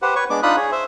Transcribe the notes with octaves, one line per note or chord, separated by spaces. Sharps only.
G4 B4 C5 F#5
B4 C#5 C#6
G#3 B3 D4 D6
D4 D#4 F4 B5 D#6 F#6
G#4 C#5
C5 E5